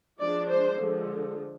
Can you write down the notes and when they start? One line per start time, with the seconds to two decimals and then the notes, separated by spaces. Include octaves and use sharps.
0.19 F3 G#3 D4 D5
0.49 C5
0.79 D3 F3 G#3